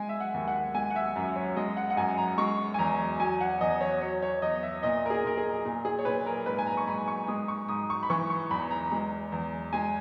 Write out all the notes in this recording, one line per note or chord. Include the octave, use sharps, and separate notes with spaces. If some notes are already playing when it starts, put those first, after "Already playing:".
Already playing: G#3 G#5
E5
F#5
D#2
F#5
G#3 G#5
F#5
E5
F#2
C#5
G#3 D#5
F#5
F#5
F#2 G#5
A#5
G#3 C#6
G#5
E2 A#5
F#3 G#5
F#5
E2 D#5
C#5
F#3 C#5
C#5
E2 D#5
E5
A#2 D#5
A#4
G#4
A#2 A#4
G#4
A#2
G#4
C#5
A#2 B4
A#4
G#2 B4
G#5
A#5
C#6
G#2 B5
C#6
G#3 D#6
C#6
G#2 D#6
C#6
B5
E3 C#6
C#6
E2 B5
A#5
G#3
E2
G#3 G#5